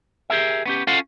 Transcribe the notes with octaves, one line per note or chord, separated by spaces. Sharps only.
G4 G#4 A#4 E5
B3 C#4 G4
C#4 F4 A4 C5 F5 F#5